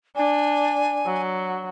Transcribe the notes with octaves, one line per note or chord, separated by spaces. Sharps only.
D4 G#5
F#3